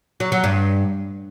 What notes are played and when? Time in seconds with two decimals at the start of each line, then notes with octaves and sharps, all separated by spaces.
0.20 F#3
0.32 F#3
0.44 G2